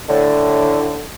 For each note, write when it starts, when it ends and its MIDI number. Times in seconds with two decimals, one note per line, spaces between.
0.09 1.02 45
0.09 1.02 50